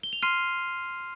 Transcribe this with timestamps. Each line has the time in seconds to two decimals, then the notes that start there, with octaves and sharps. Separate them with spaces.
0.03 G7
0.13 F7
0.23 C6 F6 C7 D#7